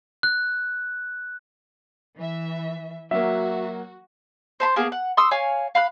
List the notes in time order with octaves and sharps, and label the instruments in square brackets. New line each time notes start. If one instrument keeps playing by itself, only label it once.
[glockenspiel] F#6
[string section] E3 E5
[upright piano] F#3 A#3 [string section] F#4 [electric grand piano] E5
[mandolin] C5 A5 B5 C6
A#3 B3 G#4
F#5
C6 C#6 D#6 E6
C#5 F5 G#5
F5 B5 F#6